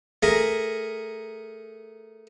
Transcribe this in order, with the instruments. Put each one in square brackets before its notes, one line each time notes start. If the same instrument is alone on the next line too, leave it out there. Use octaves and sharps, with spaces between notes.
[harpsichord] A3 G#4 A#4